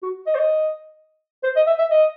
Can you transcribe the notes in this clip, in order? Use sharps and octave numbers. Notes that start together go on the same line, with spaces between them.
F#4
D#5
C5
D#5
C5
D#5
E5
E5
D#5